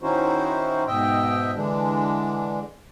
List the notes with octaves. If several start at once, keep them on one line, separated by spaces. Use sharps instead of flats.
D#3 C#4 D#4 E4 F#4 C5
G#2 B2 D#5 E5 G5
D3 E3 G#3 D4